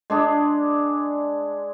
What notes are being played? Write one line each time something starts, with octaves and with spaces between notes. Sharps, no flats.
G#3 D4 G#4